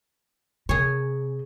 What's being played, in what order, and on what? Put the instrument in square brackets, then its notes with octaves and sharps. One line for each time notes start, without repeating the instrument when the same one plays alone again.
[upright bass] C3 [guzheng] G#4 C#5